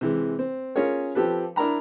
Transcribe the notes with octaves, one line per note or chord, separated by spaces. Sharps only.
C3 E3 G#3
C4
C#4 F4 G#4 A#4 C#5
F3 C4 G4 A4 B4
D4 E4 A#4 A#5 B5